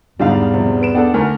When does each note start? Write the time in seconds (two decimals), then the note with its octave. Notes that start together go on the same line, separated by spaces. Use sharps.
0.19 E2 G#2 D3 G3 D4 D#4 F5
0.54 C3 F3
0.82 B4 D7 E7
0.95 B3 D4 A4 D5 F#5 G5
1.14 D2 D3 A3 A#4 G#5